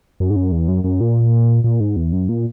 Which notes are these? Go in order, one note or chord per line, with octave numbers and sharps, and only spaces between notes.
F#2
G#2
F#2
E2
F#2
F#2
A#2
A#2
G#2
E2
F#2
A#2